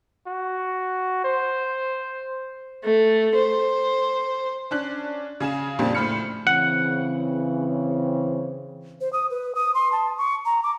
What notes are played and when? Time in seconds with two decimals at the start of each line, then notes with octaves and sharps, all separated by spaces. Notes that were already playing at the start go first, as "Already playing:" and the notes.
0.27 F#4
1.24 C5
2.84 A3
3.35 C5
4.71 C#4 D4 F#6
5.40 C#3 G#4 F5 E7
5.79 F2 A#2 C#3 G3 C4 D4
5.95 A2 C5 B5 F6 C#7
6.47 C#3 E3 C4 F#5
9.01 C5
9.13 D#6
9.30 B4
9.55 D#6
9.74 C6
9.92 A5
10.18 C#6
10.45 A#5
10.63 D6